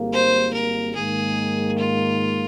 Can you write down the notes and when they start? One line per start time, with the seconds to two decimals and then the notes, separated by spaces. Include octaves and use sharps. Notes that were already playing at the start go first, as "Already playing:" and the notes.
Already playing: G#1 G#2 G3 A#3
0.13 C5
0.53 A#4
0.95 G#2 D#3 A#3 G#4
1.78 F4